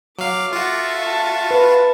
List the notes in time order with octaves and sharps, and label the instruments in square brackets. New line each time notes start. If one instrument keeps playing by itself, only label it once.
[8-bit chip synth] F#3 F5 [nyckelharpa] D6
[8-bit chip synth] F4 F#4 [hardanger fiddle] A4 E5
[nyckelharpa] A5
[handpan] B4